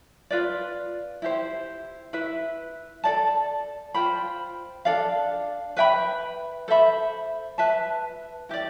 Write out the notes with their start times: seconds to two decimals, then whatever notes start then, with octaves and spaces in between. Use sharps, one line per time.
0.31 F4 B4 D5
1.22 E4 G4 C5
2.13 E4 B4 E5
3.04 A4 D5 A5
3.94 F4 C5 G5 B5
4.85 D4 A4 D5 F5
5.77 B4 E5 G5 B5
6.68 A4 C5 E5 B5
7.58 B4 E5 A5
8.49 E4 G4 D5